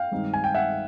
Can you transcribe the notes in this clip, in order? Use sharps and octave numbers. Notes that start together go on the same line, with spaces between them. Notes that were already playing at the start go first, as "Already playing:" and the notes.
Already playing: F5 G5
G2 D#3 G#3 C4 D#4
G#5
G5
E5 F#5